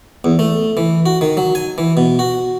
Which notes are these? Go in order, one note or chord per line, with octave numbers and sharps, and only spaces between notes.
E2
A3
E3
F#4
D#3
F#3
G#5
E3
B2
F#4